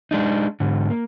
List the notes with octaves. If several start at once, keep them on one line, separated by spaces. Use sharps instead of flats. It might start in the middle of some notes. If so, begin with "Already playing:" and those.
G#3 D4 D#4
G#2 D3
A#3